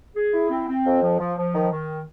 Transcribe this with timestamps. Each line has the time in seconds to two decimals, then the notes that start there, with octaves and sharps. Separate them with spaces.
0.16 G#4
0.33 E4
0.50 C4
0.68 C4
0.86 F2
1.03 F3
1.20 F3
1.37 F3
1.54 D#3
1.71 D#3